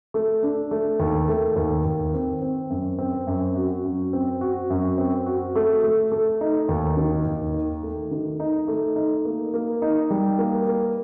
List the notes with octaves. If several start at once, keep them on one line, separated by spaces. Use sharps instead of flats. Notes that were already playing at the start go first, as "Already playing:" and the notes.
A3
D4
A3
D#2
A3
D#2
D#2
C4
C4
F#2
C4
F#2
F#4
F#2
C4
F#4
F#2
C4
F#4
A3
A3
A3
D#4
D#2
D#3
D#2
D#4
A3
D#3
D#4
A3
D#4
A#3
A#3
D#4
G3
A#3
A#3